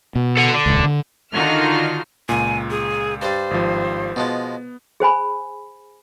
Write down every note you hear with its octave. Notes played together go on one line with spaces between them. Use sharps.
B2
A4 F#5
D3
D#1 C#2
D3
D3 D#3 D#4 F4 F#4 F6
C#2 A#2 G#5
G#4
G2 G3 C5
G#1 F3
B2 F3 G#3 B3
G#4 C5 G#5 B5